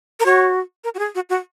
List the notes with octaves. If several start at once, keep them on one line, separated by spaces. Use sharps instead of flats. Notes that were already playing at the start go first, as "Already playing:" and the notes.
A#4
F#4 C#5
A#4
F#4
G#4
F#4
F#4